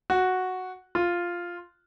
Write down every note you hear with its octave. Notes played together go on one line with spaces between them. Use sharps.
F#4
F4